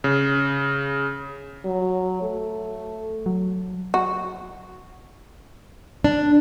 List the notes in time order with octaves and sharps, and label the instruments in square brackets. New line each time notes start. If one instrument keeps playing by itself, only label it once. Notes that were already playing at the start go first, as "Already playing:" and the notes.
[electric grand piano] C#3
[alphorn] F#3
A3
[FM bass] F#3
[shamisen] F#4
[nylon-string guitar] D4